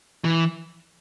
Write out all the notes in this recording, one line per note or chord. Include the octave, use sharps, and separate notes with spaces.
E3